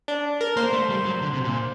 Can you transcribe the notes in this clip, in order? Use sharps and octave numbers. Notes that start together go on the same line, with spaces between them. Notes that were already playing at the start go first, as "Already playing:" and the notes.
D4
A#4
A#3 C5
A3
G3
F#3
D3
C3
A#2